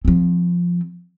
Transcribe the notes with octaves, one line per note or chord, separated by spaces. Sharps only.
F3 C4